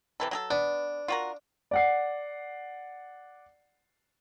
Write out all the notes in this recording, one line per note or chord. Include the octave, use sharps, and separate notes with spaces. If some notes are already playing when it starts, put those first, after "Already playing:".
C3 E3 A4
F#3 G#4 A4
B3 D4
F4 F#4 A#4
D5 F#5 C7